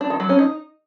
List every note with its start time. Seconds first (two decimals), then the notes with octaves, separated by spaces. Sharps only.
0.01 D4
0.10 D#3
0.20 F#3
0.29 C#4
0.39 D#4